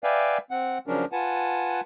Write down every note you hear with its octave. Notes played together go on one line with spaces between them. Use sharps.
B4 D5 E5 F5 G5 G#5
C4 F#5
C#3 F3 F#3 C#4 D4 A#4
F4 B4 F#5 G#5 A5